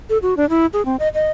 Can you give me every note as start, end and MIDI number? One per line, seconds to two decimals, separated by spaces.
0.10 0.18 69
0.22 0.34 66
0.37 0.48 62
0.50 0.66 64
0.73 0.84 68
0.86 0.96 60
0.99 1.08 75
1.14 1.31 75